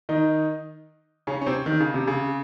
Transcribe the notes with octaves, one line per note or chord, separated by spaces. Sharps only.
D#3 D#4
C#3 C#4
C#4
C3 C4
D#3
C#3
C3
C#3